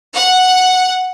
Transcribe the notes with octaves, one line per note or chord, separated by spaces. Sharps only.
F#5